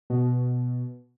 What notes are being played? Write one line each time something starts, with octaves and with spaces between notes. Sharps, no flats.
B2